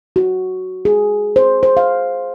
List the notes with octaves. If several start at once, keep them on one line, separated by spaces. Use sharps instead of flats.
F#4
G#4
C5
C5
F5